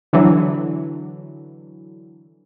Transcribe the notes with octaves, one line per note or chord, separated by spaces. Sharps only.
D3 E3 F#3